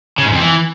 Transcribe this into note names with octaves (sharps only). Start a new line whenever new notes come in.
C#3
G#2
F2
E3